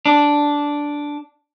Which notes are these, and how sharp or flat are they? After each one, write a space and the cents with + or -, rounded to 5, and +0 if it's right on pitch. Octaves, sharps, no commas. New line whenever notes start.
D4 -5